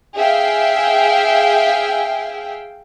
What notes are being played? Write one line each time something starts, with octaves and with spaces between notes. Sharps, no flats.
G#4 E5 F5 G5